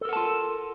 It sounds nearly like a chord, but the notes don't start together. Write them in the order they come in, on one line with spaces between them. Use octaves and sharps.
A4 A#4 F#5 A5 F4